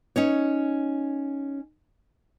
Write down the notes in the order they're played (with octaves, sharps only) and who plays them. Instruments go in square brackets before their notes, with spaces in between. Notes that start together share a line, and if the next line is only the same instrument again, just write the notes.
[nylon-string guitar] C#4 D#4 C#5